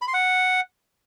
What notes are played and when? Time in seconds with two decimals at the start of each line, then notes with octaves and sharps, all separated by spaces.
0.02 B5
0.08 C6
0.14 F#5